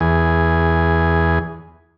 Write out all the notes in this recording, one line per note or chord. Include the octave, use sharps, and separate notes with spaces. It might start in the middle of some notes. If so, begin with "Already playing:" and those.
E2 G#4